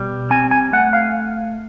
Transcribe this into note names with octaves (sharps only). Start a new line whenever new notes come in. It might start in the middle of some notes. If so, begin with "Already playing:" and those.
Already playing: B2 G3
C4 G#5
G#5
A3 F#5
F5